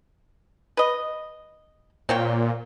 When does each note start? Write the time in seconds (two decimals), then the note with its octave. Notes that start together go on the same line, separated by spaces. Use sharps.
0.77 B4 D#5
2.09 A#2 C4 C#5 G5